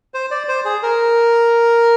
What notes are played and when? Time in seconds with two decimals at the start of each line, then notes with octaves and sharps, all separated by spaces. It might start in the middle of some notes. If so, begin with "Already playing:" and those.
0.14 C5
0.31 D5
0.48 C5
0.65 G#4
0.83 A#4